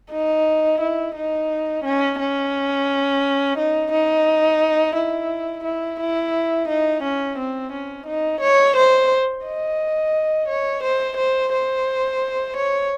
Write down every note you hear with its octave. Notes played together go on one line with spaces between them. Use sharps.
D#4
E4
D#4
C#4
C#4
D#4
D#4
E4
E4
E4
D#4
C#4
C4
C#4
D#4
C#5
C5
D#5
C#5
C5
C5
C5
C#5